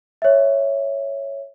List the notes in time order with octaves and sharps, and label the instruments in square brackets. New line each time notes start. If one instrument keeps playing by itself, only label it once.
[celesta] C#5 E5